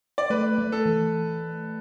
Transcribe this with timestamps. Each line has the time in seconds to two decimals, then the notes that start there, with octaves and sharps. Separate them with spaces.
0.18 D5
0.30 A3 B4
0.58 A3
0.72 A4
0.86 E3